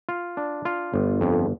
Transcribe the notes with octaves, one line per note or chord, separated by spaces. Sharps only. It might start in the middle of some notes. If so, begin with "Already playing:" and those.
F4
D4
F4
G1
F2